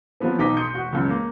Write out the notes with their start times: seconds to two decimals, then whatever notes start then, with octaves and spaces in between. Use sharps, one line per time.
0.20 F3 F#3 B3 C4
0.39 B1 D#4 D6 D#6 B6
0.57 C6 D#6 G6 C#7
0.73 E1 F#4
0.92 C#2 F#2
1.10 A#3